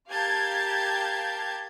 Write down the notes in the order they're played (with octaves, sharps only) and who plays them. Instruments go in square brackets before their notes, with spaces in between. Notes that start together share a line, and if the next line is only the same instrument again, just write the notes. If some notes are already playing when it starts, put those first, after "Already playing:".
[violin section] G4 A#4 F5 A5 G6 G#6